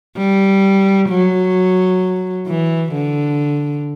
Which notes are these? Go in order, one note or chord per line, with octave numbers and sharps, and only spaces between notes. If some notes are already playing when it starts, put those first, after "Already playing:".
G3
F#3
E3
D3